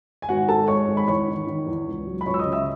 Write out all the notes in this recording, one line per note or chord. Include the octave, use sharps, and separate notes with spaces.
G#5
G#1 F#4 F#5
G#2 A4 A5
G#3 C#5 C#6
G#1
B5
E2 C#5 C#6
D#3
D#3
E2
C#2
F#3
B5
C#2 C#5 C#6
E6
D#5 D#6
C#3
E5 E6